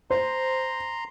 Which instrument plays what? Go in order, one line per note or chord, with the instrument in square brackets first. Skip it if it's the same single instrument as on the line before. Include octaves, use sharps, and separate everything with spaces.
[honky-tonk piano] C5 [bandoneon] A#5 C6